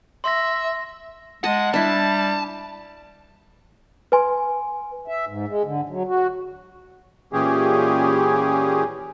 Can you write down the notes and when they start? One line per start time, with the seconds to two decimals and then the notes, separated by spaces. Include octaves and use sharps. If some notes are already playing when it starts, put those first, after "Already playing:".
0.24 E5 C6 A#6
1.44 G#3 D#5 F#5 A5
1.74 G3 D4 E4 A5
4.12 B4 G#5 C6
5.08 E5
5.27 G#2
5.48 G#3
5.65 D3
5.89 F#3
6.07 F#4
7.33 A#2 E3 C#4 G4 G#4